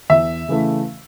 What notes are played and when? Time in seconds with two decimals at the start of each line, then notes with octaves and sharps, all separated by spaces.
0.10 E2 E5
0.48 C#3 E3 A3